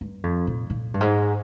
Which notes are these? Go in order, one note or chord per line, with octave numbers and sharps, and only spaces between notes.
G2
F2
A#2
A#2
G2
G#2